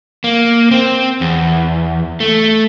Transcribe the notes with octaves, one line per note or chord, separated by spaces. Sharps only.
A#3
C4
E2
A3